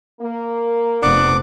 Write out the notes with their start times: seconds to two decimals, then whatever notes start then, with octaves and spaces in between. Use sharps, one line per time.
0.21 A#3
1.03 F1 B3 D4 D6